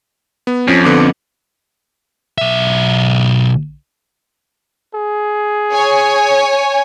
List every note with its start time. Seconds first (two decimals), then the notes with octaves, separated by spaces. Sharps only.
0.47 B3
0.68 F2 F3 C#4
0.84 D3 B3 D6
2.38 B1 E5
4.95 G#4
5.74 C#5 G#5